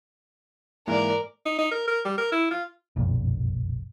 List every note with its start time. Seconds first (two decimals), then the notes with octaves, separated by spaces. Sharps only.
0.87 G#2 E3 A#3 A#4 D5
1.46 D#4
1.58 D#4
1.71 A#4
1.87 A#4
2.05 G3
2.18 A#4
2.32 E4
2.51 F4
2.96 F#1 B1 F2 A#2